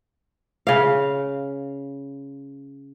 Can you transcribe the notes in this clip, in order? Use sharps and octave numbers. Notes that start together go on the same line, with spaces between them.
C#3 F5